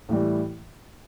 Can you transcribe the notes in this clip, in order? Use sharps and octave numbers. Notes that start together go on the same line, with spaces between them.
A2 E3 G3